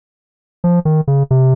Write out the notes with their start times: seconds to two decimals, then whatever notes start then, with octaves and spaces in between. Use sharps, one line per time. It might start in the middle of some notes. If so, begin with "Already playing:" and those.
0.64 F3
0.85 D#3
1.08 C#3
1.31 C3